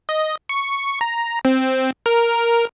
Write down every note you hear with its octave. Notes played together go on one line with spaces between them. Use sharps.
D#5
C#6
A#5
C4
A#4